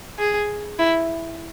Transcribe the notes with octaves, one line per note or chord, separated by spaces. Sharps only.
G#4
E4